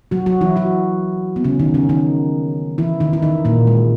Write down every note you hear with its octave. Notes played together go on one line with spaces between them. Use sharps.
F#3 F#4
F#3 F#4
E3 E4
F#3 F#4
B3
C#3 C#4
D#3 D#4
C#3 C#4
D#3 D#4
E3 E4
D#3 D#4
E4
D#3 D#4
A#2 A#3
G#3